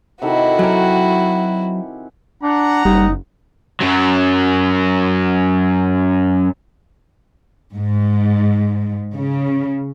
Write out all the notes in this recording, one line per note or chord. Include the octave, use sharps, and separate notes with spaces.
C3 D#3 E4 F#4 A4
F#3 G4 A#4 F#5 G#5
D4 F#5 A#5
F#1 G3 D#4
F#2 F#3
G#2
C#3